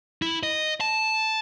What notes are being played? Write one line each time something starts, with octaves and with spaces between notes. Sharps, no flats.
E4
D#5
A5